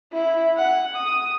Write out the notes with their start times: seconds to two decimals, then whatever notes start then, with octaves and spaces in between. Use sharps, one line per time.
0.12 E4
0.56 F#5
0.96 D#6